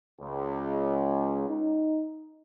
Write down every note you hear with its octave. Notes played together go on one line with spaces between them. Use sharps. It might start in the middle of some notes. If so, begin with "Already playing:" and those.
C#2
D#4